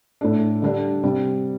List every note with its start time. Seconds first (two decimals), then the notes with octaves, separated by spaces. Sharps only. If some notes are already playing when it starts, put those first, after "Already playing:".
0.21 A2 A3 D4
0.62 D3 G3 D4
1.03 C3 G3 C4